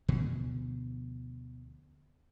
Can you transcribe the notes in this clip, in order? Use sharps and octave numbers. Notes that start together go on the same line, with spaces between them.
D2 B2 D3 F3